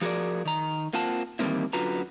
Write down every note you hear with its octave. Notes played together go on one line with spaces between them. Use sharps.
F3 F#4 G#4 A#4 D5
D#3 A#5
A#3 C4 F4 F#5 A5
D#3 E3 G3 A#3 C4 E4
F#2 D3 F4 F#4 B4 A#5